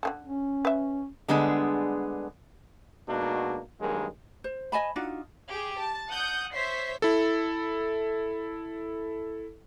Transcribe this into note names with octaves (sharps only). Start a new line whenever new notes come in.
D3 E3 A4
C#4
B4 E5
D3 G3 G#3 B3 D4 G#4
B2 G#3 A#3 D4 D#4 F#4
G2 D#3 F#3 G#3 A#3 G#4
C5
D#5 G#5 A5 B5
D4 D#4 F4 F#4
G4 G#4
A5
F#5 D#6 G6
C5 C#5 E5 B6 C7
E4 A4